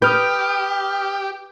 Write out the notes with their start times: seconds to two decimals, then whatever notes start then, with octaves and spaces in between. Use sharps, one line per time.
0.02 G4 B4 D#6 F6 G6